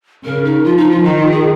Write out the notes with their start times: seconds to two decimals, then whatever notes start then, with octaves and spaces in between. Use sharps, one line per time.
0.25 C#3 A#4
0.45 D#4
0.64 F3 F4
0.77 D#4
0.90 F4
1.04 D#3 D#4
1.17 F4
1.31 G#4